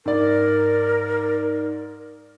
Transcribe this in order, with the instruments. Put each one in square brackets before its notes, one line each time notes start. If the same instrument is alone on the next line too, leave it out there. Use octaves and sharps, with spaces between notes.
[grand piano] G#2 D5 [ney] A#4